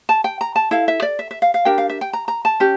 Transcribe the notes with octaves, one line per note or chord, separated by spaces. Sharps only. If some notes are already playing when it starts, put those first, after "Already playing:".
A5
G5
A#5
A5
E4 A4 F5
E5
D5
E5
E5
F5
F5
D4 G4 A#4 G5
F5
E5
G5
A#5
A#5
A5
C#4 G4